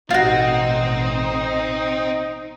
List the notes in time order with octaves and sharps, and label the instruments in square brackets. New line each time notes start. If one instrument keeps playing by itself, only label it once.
[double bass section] A1 B2 [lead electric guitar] C4 [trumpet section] D#4 [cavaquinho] F4 F#4